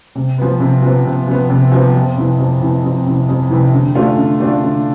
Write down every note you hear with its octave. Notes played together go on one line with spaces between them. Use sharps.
C3
F3 B3
C3
F3 B3
C3
F3 B3
C3
F3 B3
F2
C3 E3
F2
C3 E3
F2
C3 E3
F2
C3 E3
D3
A3 D4 F4
D3
A3 D4 F4
D3